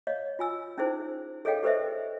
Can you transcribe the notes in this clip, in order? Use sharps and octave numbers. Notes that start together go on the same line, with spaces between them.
C#5 D#5 F5
F4 G#5 E6
C#4 D#4 E4 G#4 C5
G#4 A4 C#5 D#5 F5 G5
G4 A4 B4 C5 D#5 E5